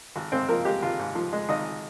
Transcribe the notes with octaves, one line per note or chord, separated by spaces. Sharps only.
G#1
G#2 C4 C5
F3 A#3 A#4
G#3 G4
G#1 F4
G#2
F3
G#3
G#1 D#4 D#5